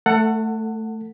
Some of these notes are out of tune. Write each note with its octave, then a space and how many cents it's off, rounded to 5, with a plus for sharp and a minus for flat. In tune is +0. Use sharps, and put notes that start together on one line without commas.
A3 +0 A4 +30 F#5 +0